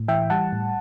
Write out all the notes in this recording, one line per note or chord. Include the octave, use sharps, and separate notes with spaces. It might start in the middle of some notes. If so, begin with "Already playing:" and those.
Already playing: A2
E3 E5 G5
G3 F#5 A5
A2